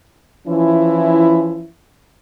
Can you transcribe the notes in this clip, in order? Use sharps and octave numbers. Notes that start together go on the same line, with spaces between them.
E3 F3 C#4 E4